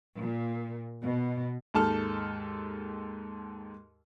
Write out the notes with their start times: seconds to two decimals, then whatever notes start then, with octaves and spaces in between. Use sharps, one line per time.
0.19 A#2
1.05 B2
1.74 D#2 G#2 A4 A5 F6